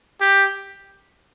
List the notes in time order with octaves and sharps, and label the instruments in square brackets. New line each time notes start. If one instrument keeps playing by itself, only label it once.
[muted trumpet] G4